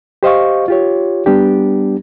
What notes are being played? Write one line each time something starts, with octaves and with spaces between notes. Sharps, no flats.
G4 C5 D#5 F5 C#6
F4 G4 C#5
G3 B3 D4 G4